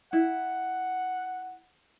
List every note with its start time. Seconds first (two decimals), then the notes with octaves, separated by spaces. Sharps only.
0.13 E4 F#5